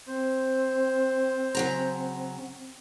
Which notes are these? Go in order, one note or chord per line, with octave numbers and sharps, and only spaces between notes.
C4 C5
C#3 F#3 A#5